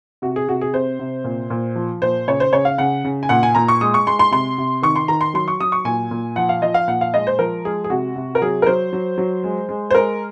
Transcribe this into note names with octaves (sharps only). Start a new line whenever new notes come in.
C3 F#4
G#4
C3 F#4
G#4
C3 C5
C3
A#2
A#2
F3
A#2 C5
C#3 C#5
C5
C#3 C#5
F5
C#3 F#5
C#3
G#5
A#2 F#5
G#5
A#2 A#5
C#6
G#3 D#6
C#6
G#3 C6
C6
C3 C6
C3
D#3 C#6
C6
D#3 A#5
C6
F#3 C6
C#6
F#3 D#6
C#6
A#2 G#5
A#2
F3 F#5
F5
F3 D#5
F5
A#2 F#5
F5
G#3 D#5
C5
F3 A#4
G#3 G#4
G#4
C3 F#4
C3
A#4
F#3 G#4
A#4
F#3 C5
F#3
F#3
G#3
G#3
C5
G#3 A#4